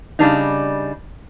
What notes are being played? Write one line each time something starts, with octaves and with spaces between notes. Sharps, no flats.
C#3 G3 D4 D#4